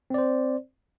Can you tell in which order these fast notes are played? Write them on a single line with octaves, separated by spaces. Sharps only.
C4 D5 C5